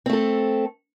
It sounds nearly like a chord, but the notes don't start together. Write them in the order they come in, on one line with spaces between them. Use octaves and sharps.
C4 A3 A4